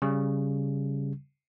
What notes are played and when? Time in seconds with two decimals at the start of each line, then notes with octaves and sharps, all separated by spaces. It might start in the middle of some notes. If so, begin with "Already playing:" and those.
0.02 C#3 G3